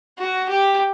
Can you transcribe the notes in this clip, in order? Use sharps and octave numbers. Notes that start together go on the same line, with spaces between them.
F#4
G4